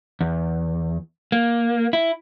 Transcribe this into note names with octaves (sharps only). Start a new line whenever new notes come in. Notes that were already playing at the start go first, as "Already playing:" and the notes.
E2
A#3
E4